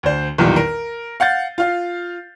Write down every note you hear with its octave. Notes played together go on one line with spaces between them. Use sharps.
D2 C5
B1 E2 A#2 D#3 G3
A#4
F5 F#5 G6 A6
F4 F5